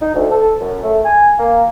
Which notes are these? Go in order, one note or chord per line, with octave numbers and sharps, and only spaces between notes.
D#4
D2
A4
F#2
A3
G#5
A#3